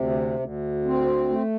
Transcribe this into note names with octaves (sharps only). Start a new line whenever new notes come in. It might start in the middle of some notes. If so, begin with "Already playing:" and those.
Already playing: D2 C3
D2
C4
A3